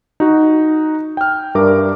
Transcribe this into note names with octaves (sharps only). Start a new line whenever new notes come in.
D#4 F#4
G5 F6
G2 D4 A#4 E5 D6